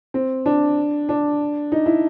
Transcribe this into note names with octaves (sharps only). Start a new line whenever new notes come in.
C4
D4
D4
D#4
E4